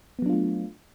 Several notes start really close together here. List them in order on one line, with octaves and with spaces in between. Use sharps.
B3 F#3 D4 F4 A3